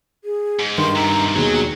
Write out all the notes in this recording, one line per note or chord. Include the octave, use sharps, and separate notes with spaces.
G#4
G#2
G2 D#3 C6
G#2 C3 A#5
D#2 B2 F#3 G#4